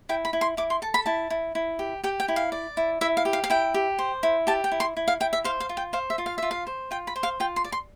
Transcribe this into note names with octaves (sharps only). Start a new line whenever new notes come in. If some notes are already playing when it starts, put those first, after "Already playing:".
E4 G5
B5
E4
C6
E4 D6
C6
A4 A5
B5
E4 A5
E4
E4
G4
G4 G5
G5
E4
F5
D5
E4
E4 E5
F5
G4
F5
F5
E4 G5
G4
C5
E4
G4 A5
G5
E4
C6
E4
F5
E4 G5
E5
C5 F5
F5
F4
G5
C5 F5
E5
F4
F5
F4 E5
F5
C5
F4 G5
B5
C5
F5
F4 G5
C6
D5
C6